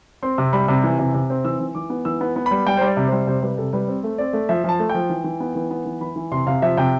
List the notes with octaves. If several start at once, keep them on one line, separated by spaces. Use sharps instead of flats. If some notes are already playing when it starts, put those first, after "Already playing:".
C4 C6
C3
G3 B5
C3
E3
C3
C3
C4
E3 E6
E3
E3 D6
B3
E3 E6
B3
B3
G3 B5
G3 G5
G3 C5
D5
C3
C5
G3
C3 C5
G3 B4
C3 A4
G3 B4
C4 C5
A3
C4 D5
A3
F3 E5
F3 A5
A3
F3 G5
E3
E3
B3
E3
B3
E3
E3 B5
E3
C3 C6
C3 F5
F3 E5
C3 G5